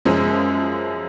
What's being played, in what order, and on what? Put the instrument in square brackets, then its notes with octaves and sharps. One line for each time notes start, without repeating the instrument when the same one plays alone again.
[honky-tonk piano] F#2 F3 G#3 C#4